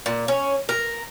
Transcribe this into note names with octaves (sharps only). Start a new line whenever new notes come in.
A#2
C#4
A#4